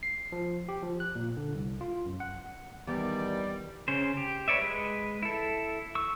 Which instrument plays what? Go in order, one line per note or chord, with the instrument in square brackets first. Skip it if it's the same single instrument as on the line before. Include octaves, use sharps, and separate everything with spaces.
[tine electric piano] C7
F3
G4
F3
F#6
A#2
D3
C2
F4
F#2
F#5
[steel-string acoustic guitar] E2 [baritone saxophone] D#3 [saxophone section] G3 [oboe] D5
[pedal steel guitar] C#3 C#4 C5
G4
B4 C#5 D5 E5
G#3 B4
E4 A4
C#6 E6